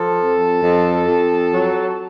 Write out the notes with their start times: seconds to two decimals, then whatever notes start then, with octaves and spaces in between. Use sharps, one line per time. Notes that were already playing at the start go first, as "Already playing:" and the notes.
Already playing: F3 A4
0.17 F2
0.62 F2
1.07 F2
1.52 F#3